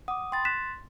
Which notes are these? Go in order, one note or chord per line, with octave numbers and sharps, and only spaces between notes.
F#5 D6 D#6
G5 B5 C6 A6
F#6 B6 E7